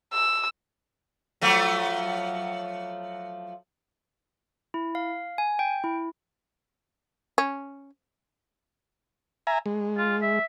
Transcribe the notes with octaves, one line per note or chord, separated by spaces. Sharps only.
E6
F3 F#3 A3
E4
F5
G#5
G5
E4
C#4
E5 G#5 A#5
G#3
F4
E5